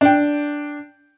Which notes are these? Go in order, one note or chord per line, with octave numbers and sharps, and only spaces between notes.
D4 G5